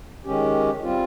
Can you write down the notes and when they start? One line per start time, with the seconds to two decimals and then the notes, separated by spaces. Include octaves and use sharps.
0.24 D#3 G#3 C#4 G4
0.82 G3 C4 F4